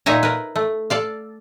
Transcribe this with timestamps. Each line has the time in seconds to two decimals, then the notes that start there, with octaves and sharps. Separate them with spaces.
0.06 A#2 D#4 C#5 E5 G#5 A#5
0.23 A#4 B4
0.56 A3
0.90 A4 D5 F5